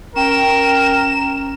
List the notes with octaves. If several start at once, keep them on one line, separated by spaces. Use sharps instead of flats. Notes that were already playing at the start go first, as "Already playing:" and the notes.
C#4 A#4 G5 E7